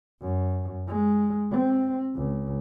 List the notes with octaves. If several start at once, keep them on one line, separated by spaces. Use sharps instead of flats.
F#2
G#3
C4
C#2